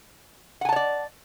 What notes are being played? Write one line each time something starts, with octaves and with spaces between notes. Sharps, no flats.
C#5 D5 F#5 G#5 A5